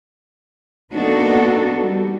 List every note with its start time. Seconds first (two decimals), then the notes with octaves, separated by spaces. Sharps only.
0.93 A#3 B3 D4 D#4 F#4 A4
1.82 G3